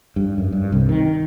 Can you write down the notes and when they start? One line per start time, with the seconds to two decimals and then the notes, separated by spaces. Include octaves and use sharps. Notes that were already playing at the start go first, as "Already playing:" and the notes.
0.16 G2
0.38 F#2
0.52 G2
0.72 C2
0.89 D#3